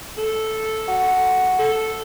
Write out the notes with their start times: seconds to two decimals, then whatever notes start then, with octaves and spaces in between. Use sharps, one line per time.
0.18 A4
0.88 F#4
1.59 A4